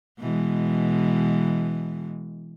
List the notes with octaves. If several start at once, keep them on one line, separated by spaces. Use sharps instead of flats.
B2 E3 G#3